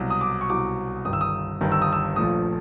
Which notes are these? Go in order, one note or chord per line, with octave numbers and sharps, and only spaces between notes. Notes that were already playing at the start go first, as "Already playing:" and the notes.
Already playing: C2 B2 F#3
D#6
D6
C#6
C2 B2 F#3 D6
G1 G2 D#3 D#6
E6
D#6
G1 G2 D#3
E6
D#6
E6
A#1 A#2 F3 A3 D#6